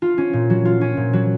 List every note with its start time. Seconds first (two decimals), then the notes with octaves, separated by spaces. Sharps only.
0.02 F4
0.18 C#4
0.33 A#2
0.50 F#3
0.65 F4
0.81 C#4
0.97 A#2
1.13 F#3